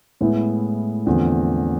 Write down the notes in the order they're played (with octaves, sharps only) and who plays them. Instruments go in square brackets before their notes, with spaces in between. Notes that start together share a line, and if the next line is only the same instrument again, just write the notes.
[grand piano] A2 G#3 B3 E4
E2 D3 F3 A3 C4